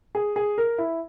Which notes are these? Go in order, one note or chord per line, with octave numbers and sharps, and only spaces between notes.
G#4
G#4
A#4
E4